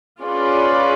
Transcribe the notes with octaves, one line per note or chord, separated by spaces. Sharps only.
C#4 F4 G#4 B4 D5